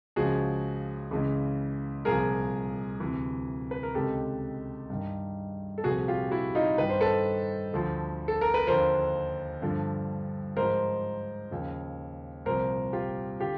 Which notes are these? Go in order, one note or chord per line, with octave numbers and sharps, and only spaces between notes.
C#2 C#3 F3 F#4 G#4
C#2 C#3 E3
C2 A#2 F3 G#4 A#4
D2 C3 E3
B4
A#4
C#2 C3 D#3 G4 A4
G2 D#3
A4
C2 A#2 F3 F#4 G#4
F4 G4
E4 F#4
D#4 F4
G2 D#3 B4
C5
A4 B4
D2 D3 F3
A4
A#4
B4
D#2 D3 F3 A#4 C5
G2 D3 F3
G#2 F3 A#4 C5
D#2 C#3 F3
C2 A#2 F3 A#4 C5
F4 G4
D3 F4 G4